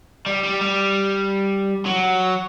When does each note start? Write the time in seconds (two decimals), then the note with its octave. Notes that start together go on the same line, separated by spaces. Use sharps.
0.26 G3
0.43 G3
0.61 G3
1.85 F#3